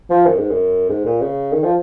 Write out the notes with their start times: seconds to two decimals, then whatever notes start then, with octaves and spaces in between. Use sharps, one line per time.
0.10 F3
0.26 F#2
0.38 G#2
0.50 F#2
0.89 G#2
1.05 A#2
1.21 C#3
1.52 D#3
1.63 F3